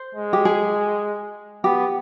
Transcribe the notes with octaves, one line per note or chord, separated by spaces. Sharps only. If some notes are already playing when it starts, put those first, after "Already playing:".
Already playing: C5
G#3
G4
G#4
B3 G4